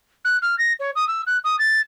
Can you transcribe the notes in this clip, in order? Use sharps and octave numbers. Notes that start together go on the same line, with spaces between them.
F#6
F6
A#6
C#5
D#6
E6
F#6
D#6
A6